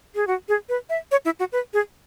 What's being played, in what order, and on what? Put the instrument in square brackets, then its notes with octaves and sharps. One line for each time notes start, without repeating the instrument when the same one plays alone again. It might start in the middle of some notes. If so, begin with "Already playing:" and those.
[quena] G#4
F#4
G#4
B4
E5
C#5
E4
F#4
B4
G#4